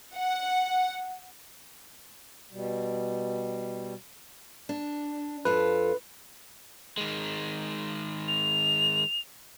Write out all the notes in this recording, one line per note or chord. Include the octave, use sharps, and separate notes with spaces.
F#5
B2 G3
D4
F2 F4 A4 B4
D#3 G#3
F7